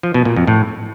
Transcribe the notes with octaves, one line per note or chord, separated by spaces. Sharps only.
F3
B2
A#2
F2
A2